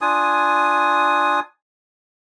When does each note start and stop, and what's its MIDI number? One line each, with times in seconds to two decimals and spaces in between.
0.01 1.40 62
0.01 1.40 65
0.01 1.40 80
0.01 1.40 87